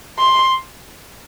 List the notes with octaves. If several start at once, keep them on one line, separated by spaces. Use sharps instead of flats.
C6